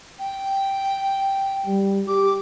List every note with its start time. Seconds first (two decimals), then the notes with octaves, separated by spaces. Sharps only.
0.19 G5
1.66 G3
2.08 G4 D6